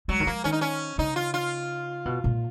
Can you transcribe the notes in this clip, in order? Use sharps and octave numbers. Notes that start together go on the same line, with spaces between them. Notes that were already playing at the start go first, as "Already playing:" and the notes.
F#3 G#3
D#3
F3 A#3
D#3 C#4
D#4
C#4
C#3 D#4
F4
F4
B2
A#2